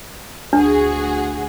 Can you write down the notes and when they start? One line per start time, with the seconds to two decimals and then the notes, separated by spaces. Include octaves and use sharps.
0.53 D2 D4 F#4 G#4